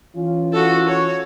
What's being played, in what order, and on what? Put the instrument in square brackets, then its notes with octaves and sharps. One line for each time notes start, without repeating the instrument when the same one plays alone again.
[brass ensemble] E3 C#4 F4
[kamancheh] F#4 A4
C#5